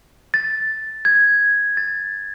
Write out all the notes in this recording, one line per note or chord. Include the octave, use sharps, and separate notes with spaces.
A6
G#6
A6